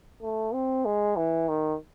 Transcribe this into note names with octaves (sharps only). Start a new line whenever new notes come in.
A3
C4
G#3
E3
D#3